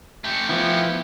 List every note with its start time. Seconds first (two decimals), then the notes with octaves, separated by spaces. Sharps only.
0.24 A3 G4
0.49 F3 B3 E4